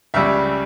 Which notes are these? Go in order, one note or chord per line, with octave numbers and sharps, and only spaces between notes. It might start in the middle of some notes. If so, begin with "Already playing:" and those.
C#2 C#3 G3 E5